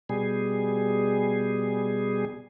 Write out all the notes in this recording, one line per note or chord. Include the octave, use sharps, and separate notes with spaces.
B2 G3 G#4